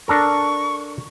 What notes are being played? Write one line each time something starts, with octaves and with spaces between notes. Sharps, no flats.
D4 A4 A#4 C#6